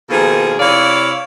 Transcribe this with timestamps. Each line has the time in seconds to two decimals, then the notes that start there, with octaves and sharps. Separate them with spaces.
0.10 B2 D#3 F3 A#3 G#4 A4
0.60 C3 E4 C#5 D5 F5